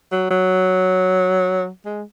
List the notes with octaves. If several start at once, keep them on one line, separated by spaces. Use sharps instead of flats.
F#3
F#3
G#3